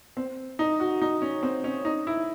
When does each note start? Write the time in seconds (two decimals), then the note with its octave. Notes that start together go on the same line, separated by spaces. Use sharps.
0.17 C4
0.59 D#4
0.80 F#4
1.02 D#4
1.22 C#4
1.43 C4
1.64 C#4
1.85 D#4
2.07 E4